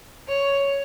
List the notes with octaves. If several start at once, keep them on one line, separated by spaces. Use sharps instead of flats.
C#5